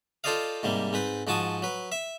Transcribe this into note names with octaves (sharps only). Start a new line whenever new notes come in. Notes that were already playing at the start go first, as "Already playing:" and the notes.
F4 A4 C5 D5 D#5 F5
G#2 C3 G3 A#3
G#2 C4 B4
G#2 F3 F#4 A5 C#6 D#6
F#3 B4
E5